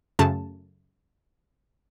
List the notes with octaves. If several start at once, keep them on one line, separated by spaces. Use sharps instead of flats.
F#2 C#3 A3 A5